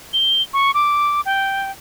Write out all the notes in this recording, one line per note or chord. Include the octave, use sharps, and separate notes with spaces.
G7
C#6
D6
G5